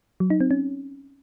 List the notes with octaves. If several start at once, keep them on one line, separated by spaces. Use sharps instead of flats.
F#3
D#4
C4
C#4